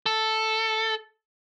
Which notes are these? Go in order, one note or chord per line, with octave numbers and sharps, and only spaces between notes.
A4